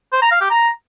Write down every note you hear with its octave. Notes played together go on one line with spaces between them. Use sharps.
C5
A#5
F5
G4
A#5